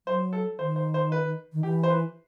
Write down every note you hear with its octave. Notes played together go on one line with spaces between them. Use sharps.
F#3 C5
A4
D#3 C5
C5
C5
B4
D#3
E3 G4
C5
B4